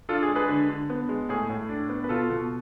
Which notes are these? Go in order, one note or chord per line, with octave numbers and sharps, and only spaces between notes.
D4 F4 A4
G#4
G#3
G#4 B4
D3
D3
B3
G#3
A2 G#4
A2
D4
B3
B4
B2 F4 A4
B2